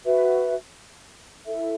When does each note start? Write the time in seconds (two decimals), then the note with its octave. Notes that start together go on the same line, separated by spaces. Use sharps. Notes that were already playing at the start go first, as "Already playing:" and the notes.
0.05 F#4 B4 E5
1.45 E4 A4 E5